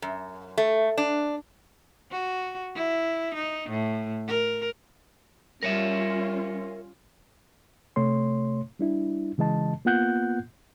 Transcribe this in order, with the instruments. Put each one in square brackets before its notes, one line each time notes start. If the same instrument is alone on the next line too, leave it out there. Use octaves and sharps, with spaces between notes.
[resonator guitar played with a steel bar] F#2
A3
D4
[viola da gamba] F#4
E4
D#4
A2
A#4
[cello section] G3 [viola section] C#4 F4 [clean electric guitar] A#4 C#5 E5
[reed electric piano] C3 A3 C#5 C6
G3 D4 E4
C#3 E3 G#3 D#5 A5
A#3 B3 F4 F#5 F#6 G6